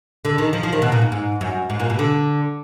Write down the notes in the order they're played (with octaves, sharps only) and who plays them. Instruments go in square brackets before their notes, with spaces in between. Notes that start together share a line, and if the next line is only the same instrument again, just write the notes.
[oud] D3
D#3
F3
F3
D#3
B2
A#2
G#2
G#2
F#2
G#2
A#2
B2
D3